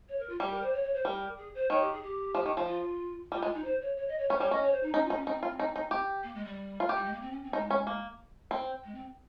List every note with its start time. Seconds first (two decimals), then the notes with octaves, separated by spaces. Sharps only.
0.09 C#5
0.19 A#4
0.29 F4
0.40 G3 G4
0.51 A#4
0.62 C5
0.73 C#5
0.84 C#5
0.94 C5
1.05 G3 A#4
1.37 G#4
1.55 C5
1.70 D#3 C#5
1.80 G4
1.92 G#4
2.03 G4
2.35 F3
2.46 D#3
2.57 F3
2.67 F4
3.32 G3 F4
3.42 G#3 F4
3.54 D#4
3.64 C5
3.81 C#5
3.97 C#5
4.08 D#5
4.19 C#5
4.29 C#4 C#5
4.35 C5
4.40 G3 C#5
4.51 C#4 D#5
4.62 C#5
4.72 C5
4.83 D#4
4.94 C#4 D#4
5.05 F4
5.10 D#4
5.16 C#4
5.26 C4 D#4
5.43 F4
5.59 D#4
5.76 D#4
5.91 G4
6.23 A#3
6.35 G#3
6.45 G3
6.80 F4
6.89 G4
6.97 G3
7.05 G#3
7.13 A#3
7.22 C4
7.31 C#4
7.43 C4
7.53 G#3 D#4
7.71 C#4
7.87 A#3
8.51 C4
8.84 G#3
8.94 C4